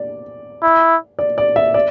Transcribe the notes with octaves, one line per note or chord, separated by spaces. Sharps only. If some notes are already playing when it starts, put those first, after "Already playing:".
Already playing: D5
E4
D5
D5
E5
D5